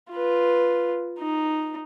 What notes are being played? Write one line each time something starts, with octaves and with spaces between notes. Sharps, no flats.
F4 B4
D#4